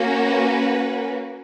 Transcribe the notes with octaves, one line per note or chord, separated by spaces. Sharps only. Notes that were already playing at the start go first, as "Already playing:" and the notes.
Already playing: A#3 C#4 F#4
B4